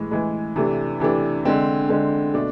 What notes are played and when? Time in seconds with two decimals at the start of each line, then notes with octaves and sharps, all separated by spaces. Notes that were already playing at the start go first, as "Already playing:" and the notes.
Already playing: A2 E3 G#3
0.11 A2 E3 G#3
0.56 C3 E3 A3 D4
1.00 C3 E3 A3 D4
1.45 D3 G#3 C4
1.89 D3 G#3 C4
2.34 B2 A3 D4